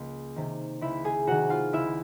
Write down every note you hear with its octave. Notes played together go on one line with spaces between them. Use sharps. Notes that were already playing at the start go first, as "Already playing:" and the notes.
Already playing: C#2 A#3
C3 D#3
C#2 E4 E5
G#4 G#5
C3 D#3 F#4 F#5
F4 F5
C#2 E4 E5